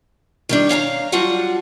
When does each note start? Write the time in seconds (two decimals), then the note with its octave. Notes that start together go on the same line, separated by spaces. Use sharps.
0.49 D#3 G3 D4
0.69 C#5 F5 A5 A#5
1.12 F#3 G3 F4 F#4 F#5 A5